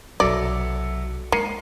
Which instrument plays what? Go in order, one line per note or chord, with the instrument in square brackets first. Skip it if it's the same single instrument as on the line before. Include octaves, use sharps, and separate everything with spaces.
[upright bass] B1 C3 [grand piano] F#3 A4 E5 [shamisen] D5
[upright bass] G#3 D#4 [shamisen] A#3 [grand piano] C7 C#7 D#7